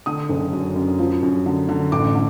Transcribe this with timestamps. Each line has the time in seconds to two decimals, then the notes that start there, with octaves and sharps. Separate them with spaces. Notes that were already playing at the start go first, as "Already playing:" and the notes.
0.06 D3 D#6
0.29 F#1
0.53 F#2
0.76 F#2
0.99 F3
1.23 F#2
1.46 D3
1.69 D3
1.92 A1 D6
2.15 D3